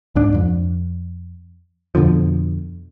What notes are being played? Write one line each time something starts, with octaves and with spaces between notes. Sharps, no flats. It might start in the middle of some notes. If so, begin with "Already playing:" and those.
C#2 G#2 D4
F2
F2 B2 D3 F3